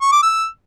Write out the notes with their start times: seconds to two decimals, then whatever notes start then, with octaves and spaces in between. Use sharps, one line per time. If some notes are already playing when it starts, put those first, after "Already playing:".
0.01 C#6
0.12 D6
0.23 E6